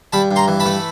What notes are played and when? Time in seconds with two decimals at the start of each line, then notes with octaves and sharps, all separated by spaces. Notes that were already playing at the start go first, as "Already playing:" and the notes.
0.13 G2 A5 B5
0.31 G2
0.36 A#5 C6
0.48 E3
0.60 A5 B5
0.66 A3